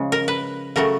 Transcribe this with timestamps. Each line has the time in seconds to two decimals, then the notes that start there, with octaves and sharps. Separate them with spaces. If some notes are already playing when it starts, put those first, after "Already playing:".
Already playing: C#3 F3 G#3
0.12 A#4
0.28 B4
0.76 C#3 F#3 A3 A#4